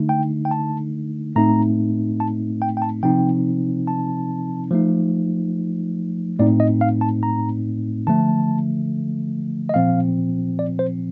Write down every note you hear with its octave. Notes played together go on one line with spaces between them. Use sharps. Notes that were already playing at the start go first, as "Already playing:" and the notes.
Already playing: D3 A3 D#4
G5
G5
A5
A2 A3 C4 D#4 A#5
A5
G5
G5
A5
C3 F3 C4 D#4 G5
A5
F3 A3 D#4
A2 A3 C4 D#4 D5
D#5
F5
A5
A#5
D3 F3 A3 A5
D#5
A#2 F3 C4 F5
D5
C5